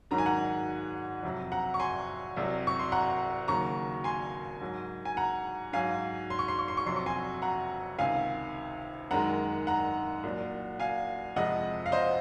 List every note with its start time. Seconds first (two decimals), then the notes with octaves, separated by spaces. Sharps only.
0.11 G#2 D#3 F#3 A#5
0.18 G#5
0.26 F#5 A#5
1.23 F2 C3 F#3
1.52 F#5 A#5
1.74 C#6
1.80 G#5 C6
2.36 C2 C3 F#3
2.67 C#6
2.79 C6
2.92 F#5 A#5
3.48 D#2 C#3 F#3 A#5 C#6
4.04 G#5 C6
4.61 G#2 F#3
5.05 G#5
5.17 F#5 A#5
5.73 G#2 F#3 F5 G#5
6.30 C6
6.39 C#6
6.48 C6
6.59 C#6
6.68 C6
6.77 C#6
6.86 F2 C3 F#3 C6
6.96 C#6
7.06 G#5 C6
7.42 F#5 A#5
7.99 C#2 C3 D#3 F5 G#5
9.11 F#2 D#3 G#3 F#5 A#5
9.67 F#5 A#5
10.23 C2 A#2 F#3
10.80 F5 G#5
11.36 F2 C3 F3 G#3 D#5 F#5
11.86 F5
11.92 C5 D#5